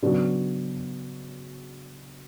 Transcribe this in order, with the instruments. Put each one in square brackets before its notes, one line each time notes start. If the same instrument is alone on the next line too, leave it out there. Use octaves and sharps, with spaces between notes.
[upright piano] C#3 F#3 B3 D4 F#4